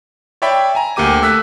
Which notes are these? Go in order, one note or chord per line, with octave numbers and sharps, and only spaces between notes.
C#5 D5 E5 G5 B5
G#5 A#5
D2 A#3 G4 D6 D#7
A3 E6 F#6 B6